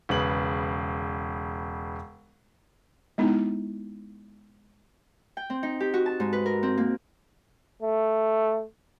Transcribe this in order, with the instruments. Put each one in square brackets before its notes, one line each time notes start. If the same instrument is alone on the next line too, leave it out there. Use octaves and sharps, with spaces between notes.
[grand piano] E1 C#3 B4 F#7
[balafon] G#3 B3 D#4 E4
[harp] G5
C4
D#4
G4
F#4
A5
G#2
B4
A#4
C4
A#3
[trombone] A3